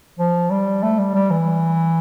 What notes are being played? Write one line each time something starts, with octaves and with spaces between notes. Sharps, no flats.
F3
G3
A3
G3
G3
E3